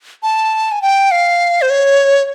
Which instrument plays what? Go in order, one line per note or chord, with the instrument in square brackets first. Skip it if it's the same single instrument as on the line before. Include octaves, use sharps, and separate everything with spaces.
[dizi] A5
G#5
G5
F5
C5
C#5